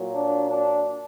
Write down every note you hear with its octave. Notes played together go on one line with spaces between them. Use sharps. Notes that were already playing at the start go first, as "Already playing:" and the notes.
Already playing: A#2 F#3
D4
D4